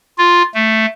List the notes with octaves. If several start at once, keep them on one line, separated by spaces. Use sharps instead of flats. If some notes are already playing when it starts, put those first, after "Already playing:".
F4
A3